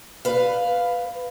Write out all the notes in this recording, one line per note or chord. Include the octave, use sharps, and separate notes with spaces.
B4 F5